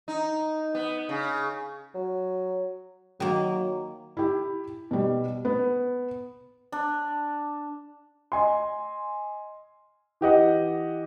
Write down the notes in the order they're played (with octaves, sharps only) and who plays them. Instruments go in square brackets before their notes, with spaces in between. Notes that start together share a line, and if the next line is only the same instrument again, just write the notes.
[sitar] D#4
B3
C#3
[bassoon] F#3
[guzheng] D#3 A#3 [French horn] F#3
[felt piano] E4 G4
B2 G3
B3
[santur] D4
[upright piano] D#5 G#5 C6
E3 G4 D#5 F#5